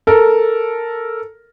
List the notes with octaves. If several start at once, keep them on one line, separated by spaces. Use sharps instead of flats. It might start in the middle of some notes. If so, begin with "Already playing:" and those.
A4 A#4